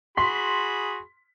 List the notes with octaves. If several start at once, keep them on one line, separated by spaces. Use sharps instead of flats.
F#4 G#4 B5 C6 B6